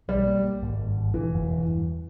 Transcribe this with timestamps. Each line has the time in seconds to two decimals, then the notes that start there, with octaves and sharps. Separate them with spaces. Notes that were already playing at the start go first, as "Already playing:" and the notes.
0.08 B1 G3
0.27 A#3
0.44 A#3
0.62 G#1
0.79 G2
0.96 G#1
1.14 E1 E3
1.32 E1
1.50 E2
1.68 G2